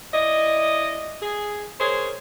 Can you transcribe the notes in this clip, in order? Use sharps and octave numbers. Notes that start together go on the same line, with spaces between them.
E4 D5 D#5
G#4
G#4 A#4 C5 C#5